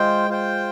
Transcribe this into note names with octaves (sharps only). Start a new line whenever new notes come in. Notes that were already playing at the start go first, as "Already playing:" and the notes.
Already playing: G#3 F4 C5 G5
F4 C5 G5